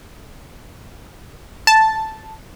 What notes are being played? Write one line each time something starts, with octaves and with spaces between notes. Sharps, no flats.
A5